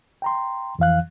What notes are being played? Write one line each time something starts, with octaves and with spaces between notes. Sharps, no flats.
G5 A#5 C6
F2 E3 F5 F#6